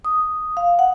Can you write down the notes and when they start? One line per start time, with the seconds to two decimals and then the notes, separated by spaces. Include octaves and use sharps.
0.05 D#6
0.57 F5
0.79 F#5